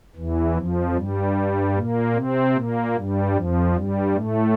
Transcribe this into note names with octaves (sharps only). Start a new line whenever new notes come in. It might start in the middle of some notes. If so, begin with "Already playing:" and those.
E2 E3
F2 F3
G2 G3
A#2 A#3
C3 C4
A#2 A#3
G2 G3
F2 F3
G2 G3
A2 A3